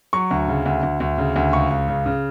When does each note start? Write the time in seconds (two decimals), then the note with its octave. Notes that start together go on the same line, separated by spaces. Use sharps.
0.13 F#3 C#6
0.31 D2
0.48 C#3
0.66 D2
0.83 D2
1.00 D2
1.18 C#3
1.36 D2
1.53 C#2 C#6
1.71 C#2
1.88 C#3
2.06 C#3